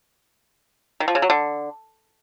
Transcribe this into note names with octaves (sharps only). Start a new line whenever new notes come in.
D#3
F3
C#3
F#3
D3